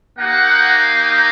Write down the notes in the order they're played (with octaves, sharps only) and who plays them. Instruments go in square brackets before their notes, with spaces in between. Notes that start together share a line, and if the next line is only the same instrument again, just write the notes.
[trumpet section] A#3 D#4 G4 F#5